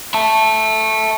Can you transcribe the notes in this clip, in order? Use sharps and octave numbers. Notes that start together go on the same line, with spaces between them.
E5 A5